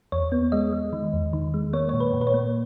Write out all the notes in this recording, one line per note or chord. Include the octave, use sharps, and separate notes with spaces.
E2 C#5
B3
G#3 D#5
G#3
D#3
E2
D#3
G#3
A#3 C#5
A#2 C#5
B4
A#2
B4
C#5
A#3